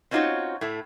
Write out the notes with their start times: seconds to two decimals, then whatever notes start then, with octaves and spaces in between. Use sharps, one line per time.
0.11 C4 C#4 D#4 F4 F#4 C#5
0.61 A2 A3